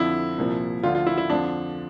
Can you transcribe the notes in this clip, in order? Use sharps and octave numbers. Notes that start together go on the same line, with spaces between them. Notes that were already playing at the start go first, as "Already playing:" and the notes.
Already playing: F2 D3 F3 E4
C2 A#2 F3
D2 D3 F3 F4
F4
E4
E4
F2 D3 F3 D4